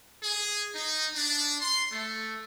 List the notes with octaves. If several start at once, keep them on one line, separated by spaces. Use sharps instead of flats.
G#4
D#4
D4
C6
A3